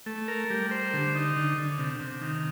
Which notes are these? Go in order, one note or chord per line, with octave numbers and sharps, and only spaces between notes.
A3
A#4
G3
C5
D3
D#4
D3
D3
C3
C3
D#3